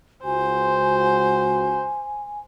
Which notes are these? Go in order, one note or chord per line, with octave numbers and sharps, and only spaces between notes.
C#2 F#4 C5 G#5